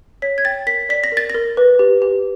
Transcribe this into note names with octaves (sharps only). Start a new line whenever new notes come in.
C#5 B6
G#6
G5 A6
A#4 B6
D5 B6
A#6
A#4 A6
A#6
A#4
B4
G4
G4